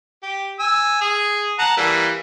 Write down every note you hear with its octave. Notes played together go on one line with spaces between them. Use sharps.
G4
G#5 E6
G#4
F#5 A5 A#5
E3 G3 A#3